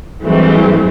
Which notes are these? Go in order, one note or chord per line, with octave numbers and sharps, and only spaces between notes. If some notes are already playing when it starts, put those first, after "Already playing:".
G2 E3 F#3 G#3 A3 C4